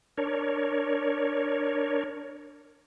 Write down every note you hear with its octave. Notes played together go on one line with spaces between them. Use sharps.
D4 A#4 C#5